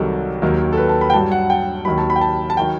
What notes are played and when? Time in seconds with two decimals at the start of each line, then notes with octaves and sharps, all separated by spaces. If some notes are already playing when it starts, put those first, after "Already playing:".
Already playing: C2 C3 D#3 F#3 A4
0.42 D#2 D#3 F#3
0.73 A4
0.77 B4
0.89 A5
1.01 B5
1.10 G5
1.14 G2 F#3 A5
1.32 F#5
1.50 G5
1.85 D#2 D#3 F#3 B5
1.98 A5
2.10 B5
2.16 G5
2.21 A5
2.50 A5
2.57 D#3 F#3 G5